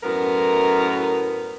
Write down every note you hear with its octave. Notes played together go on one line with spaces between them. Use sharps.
F#2 A2 B3 A#4